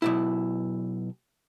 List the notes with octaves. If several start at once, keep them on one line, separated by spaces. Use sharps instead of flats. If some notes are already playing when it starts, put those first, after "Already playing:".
B1 F#2 E4